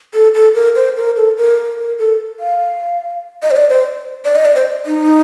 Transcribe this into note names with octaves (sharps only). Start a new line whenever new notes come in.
A4
A4
A#4
C5
A#4
A4
A#4
A#4
A4
F5
D#5
C5
D5
C5
D5
D#5
D5
C5
D#4